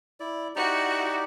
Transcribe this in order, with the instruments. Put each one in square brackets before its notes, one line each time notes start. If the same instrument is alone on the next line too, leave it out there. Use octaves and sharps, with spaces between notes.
[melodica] E4 D5
[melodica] D#4 G4 D5 [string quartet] E4 F#4